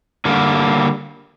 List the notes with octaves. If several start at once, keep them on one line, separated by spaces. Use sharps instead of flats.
D3 G3 A#3